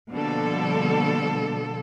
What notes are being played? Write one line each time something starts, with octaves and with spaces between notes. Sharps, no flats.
B2 D3 F3 G3 A#3 A4